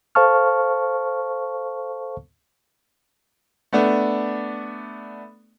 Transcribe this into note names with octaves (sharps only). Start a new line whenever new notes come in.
A4 C5 F5 A5 C#6 F6
A3 B3 D4